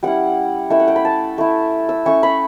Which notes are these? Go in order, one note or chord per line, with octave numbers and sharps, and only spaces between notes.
G3 C#4 E4 F#5
A3 C#4 E4 E5
F#5
G5
B5
A5
A3 E4
E6
A3 C#4 E4 C#6
B5